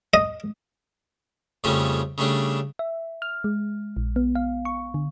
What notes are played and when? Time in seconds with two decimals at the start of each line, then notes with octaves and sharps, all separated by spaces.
0.14 D#5
1.64 F2 C#3 G3 A3 C#4
2.18 C#3 G3 A3 D4
2.79 E5
3.22 F6
3.44 G#3
3.97 A#1
4.16 B3
4.35 F5
4.65 C#6
4.94 D3